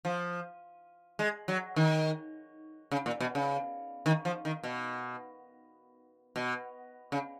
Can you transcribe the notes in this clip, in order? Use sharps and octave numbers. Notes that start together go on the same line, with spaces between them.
F3
G#3
F#3
D#3
C#3
A#2
B2
C#3
D#3
F3
D#3
B2
B2
C#3